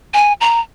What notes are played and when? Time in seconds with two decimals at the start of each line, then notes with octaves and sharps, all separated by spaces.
0.14 G#5
0.41 A#5